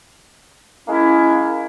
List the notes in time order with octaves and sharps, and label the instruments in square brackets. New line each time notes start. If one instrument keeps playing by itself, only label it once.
[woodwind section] G#3 A#3 C#4 E4